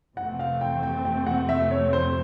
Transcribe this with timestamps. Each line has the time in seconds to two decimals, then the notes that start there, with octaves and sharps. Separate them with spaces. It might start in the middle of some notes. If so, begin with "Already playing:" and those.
0.17 F2 C3 E3 A3 C4 F#5
0.39 F5
0.61 G5
0.83 G5
1.05 G5
1.27 F#5
1.49 E5
1.71 C#5
1.93 C5